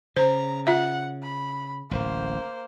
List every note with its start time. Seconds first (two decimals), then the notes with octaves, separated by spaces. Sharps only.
0.16 C#3 C5 A#5
0.67 F4 E5 F#5
1.23 B5
1.91 D1 A1 A#3 C5